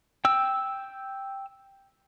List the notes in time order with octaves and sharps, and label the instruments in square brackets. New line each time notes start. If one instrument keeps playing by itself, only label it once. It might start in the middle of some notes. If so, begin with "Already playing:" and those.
[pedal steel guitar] G5 E6